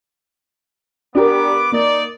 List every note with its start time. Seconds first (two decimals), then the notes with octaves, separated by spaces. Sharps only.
1.15 B3 D4 G4 A#4 D6
1.72 A#3 D#4 D5